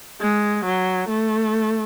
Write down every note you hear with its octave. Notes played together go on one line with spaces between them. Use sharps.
G#3
F#3
A3